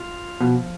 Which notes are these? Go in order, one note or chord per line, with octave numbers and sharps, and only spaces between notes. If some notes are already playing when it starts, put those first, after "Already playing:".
Already playing: F4
B2 F3